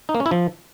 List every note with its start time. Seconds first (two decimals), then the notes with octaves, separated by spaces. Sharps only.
0.09 D#4
0.15 A#3
0.20 C#4
0.26 E4
0.31 F3